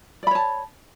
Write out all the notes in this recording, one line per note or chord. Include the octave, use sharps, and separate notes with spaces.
C#5 D5 A5 B5